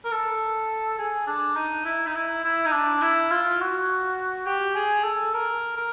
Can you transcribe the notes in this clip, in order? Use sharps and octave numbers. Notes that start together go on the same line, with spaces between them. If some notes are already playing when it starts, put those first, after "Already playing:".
A#4
A4
G#4
D4
D#4
E4
D#4
E4
E4
D#4
D4
E4
F4
F#4
G4
G#4
A4
A#4
A#4